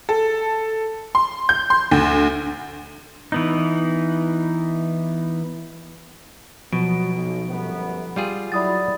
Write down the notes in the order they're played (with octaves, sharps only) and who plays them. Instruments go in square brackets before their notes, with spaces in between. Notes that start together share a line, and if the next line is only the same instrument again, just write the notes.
[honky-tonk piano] A4
C6
G6
C6
D2
[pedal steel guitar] E3 B3 D#4
[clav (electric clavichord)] B2 [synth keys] F3 [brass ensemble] F#3 B3 [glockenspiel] D7
[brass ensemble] B1
G1 F#2 B3
[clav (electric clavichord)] G3 F4 G#4
[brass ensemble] F#3 E4 [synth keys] D5 F#5 [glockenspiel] B5 D#6 A6